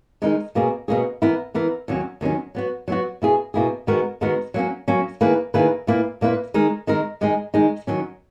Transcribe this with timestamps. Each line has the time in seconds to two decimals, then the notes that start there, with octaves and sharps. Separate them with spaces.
0.22 D#3 G#3 D#4 A#4
0.55 B2 A#3 C#4 G#4
0.88 B2 A#3 C#4 G#4
1.22 E3 B3 E4 A#4
1.54 E3 B3 E4 A#4
1.88 D#2 D#3 F#3 C#4
2.21 D#2 D#3 F#3 C#4
2.55 F#3 B3 F#4
2.88 F#3 B3 F#4
3.22 B2 A#3 E4 G#4
3.54 B2 A#3 E4 G#4
3.87 D#3 G#3 B3 F#4 A#4
4.21 D#3 G#3 B3 F#4 A#4
4.54 F#3 A#3 C#4
4.88 F#3 A#3 C#4
5.21 D#3 A#3 E4 G#4 B4
5.54 D#3 A#3 E4 G#4 B4
5.87 A#2 A#3 E4 B4
6.21 A#2 A#3 E4 B4
6.54 D#3 G#3 D#4 A#4
6.87 D#3 G#3 D#4 A#4
7.21 D#3 G#3 D#4 G#4
7.54 D#3 G#3 D#4 G#4
7.87 D#3 F#3 C#4